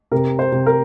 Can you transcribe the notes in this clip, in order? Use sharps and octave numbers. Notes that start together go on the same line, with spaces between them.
C3 A#4
C5
C3
A#4